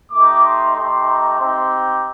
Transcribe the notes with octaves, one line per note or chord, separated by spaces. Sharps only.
A3 D#4 G4 D6
C6
A3 D#4 G4 C6
A#5
C4 D#4 G4 C6